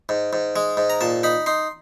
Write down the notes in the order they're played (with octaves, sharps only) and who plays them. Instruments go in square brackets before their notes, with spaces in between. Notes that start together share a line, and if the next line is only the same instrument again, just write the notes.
[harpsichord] G#2
G#2
G#3
G#2
A#5
A#2 A5
D#4 B5
D#4 C6